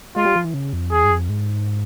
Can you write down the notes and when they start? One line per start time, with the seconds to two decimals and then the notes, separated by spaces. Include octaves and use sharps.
0.16 G#3 F4
0.25 G3
0.36 F3
0.44 E3
0.54 C#3
0.73 F2
0.92 E2 G#4
1.05 G2
1.11 F2
1.29 G#2